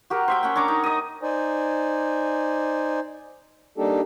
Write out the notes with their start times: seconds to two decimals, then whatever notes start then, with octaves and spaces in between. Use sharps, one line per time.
0.10 F#4 G4 A#4
0.28 C5 E5 G5
0.43 C#4 F#5 G5
0.56 D4 C#5 A#5 D6
0.68 D#4
0.84 D#5 D#6
1.23 D#4 C5 D5 G#5
3.78 G3 A#3 D4 D#4 G4 A4